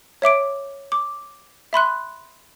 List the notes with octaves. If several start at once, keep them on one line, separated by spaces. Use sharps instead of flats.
C#5 E5 D6 D7
D6
E5 B5 C6 F#6